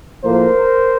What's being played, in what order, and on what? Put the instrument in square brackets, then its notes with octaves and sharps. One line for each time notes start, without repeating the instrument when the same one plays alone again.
[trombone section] A2 F3 A#3 A#4 C5